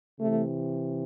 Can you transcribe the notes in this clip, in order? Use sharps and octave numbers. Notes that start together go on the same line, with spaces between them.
C3 E3 A3